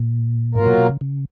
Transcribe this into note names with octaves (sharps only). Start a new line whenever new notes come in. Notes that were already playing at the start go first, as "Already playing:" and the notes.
Already playing: A#2
G#2 F#3 A#3 F4 A#4
B2
B2
C#3
C#3